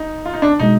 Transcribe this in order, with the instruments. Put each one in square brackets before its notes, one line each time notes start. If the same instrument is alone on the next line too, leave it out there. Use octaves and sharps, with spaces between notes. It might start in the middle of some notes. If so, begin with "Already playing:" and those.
Already playing: [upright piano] D#4
F4
D#4
D4
[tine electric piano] B2 G#3 [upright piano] D#4